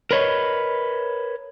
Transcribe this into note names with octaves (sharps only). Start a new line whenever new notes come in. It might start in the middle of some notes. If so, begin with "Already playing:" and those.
A#4 B4 C#5 D#5